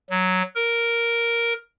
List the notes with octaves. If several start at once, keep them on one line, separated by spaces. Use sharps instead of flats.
F#3
A#4